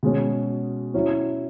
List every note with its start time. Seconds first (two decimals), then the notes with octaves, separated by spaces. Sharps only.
0.03 B2 G#3 C#4
0.94 F#3 C#4 E4